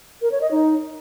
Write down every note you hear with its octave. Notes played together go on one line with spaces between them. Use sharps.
A#4
C#5
D#5
D#4